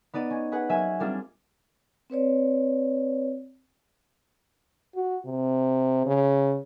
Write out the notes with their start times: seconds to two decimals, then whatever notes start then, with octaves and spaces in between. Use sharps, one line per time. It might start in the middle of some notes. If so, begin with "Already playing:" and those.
0.14 B3 D#4 D5 D#7
0.30 C#4
0.52 G#4 B4 F#5
0.69 F#3 A#3 E5 G#5 D#7
1.00 G3 A#3 C4 D4 F4 G#4
2.10 C4 B4 C#5 D5
4.95 F#4
5.26 C3
6.06 C#3